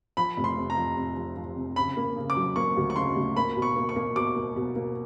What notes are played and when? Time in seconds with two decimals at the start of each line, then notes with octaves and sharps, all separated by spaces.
0.17 F3 B5
0.37 F1
0.44 C6
0.57 C3
0.70 A#5
0.77 F3
0.97 C3
1.17 F3
1.36 F3
1.56 C3
1.76 C#3 B5
1.97 A#3
2.16 C#3
2.30 D6
2.36 F#3
2.56 A#3 C#6
2.77 D2
2.90 C#6
2.96 C#3 C6
3.16 D2
3.36 A#3 B5
3.56 B2
3.62 C#6
3.76 A#3
3.89 C#6
3.96 A#3
4.16 B2 D6
4.36 A#3
4.56 B2
4.76 A#3